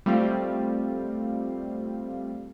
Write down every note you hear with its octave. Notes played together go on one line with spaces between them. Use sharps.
G3 A3 C4 F4 F5